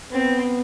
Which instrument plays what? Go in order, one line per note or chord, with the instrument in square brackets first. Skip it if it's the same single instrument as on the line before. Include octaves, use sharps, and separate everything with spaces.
[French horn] B3 [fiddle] C4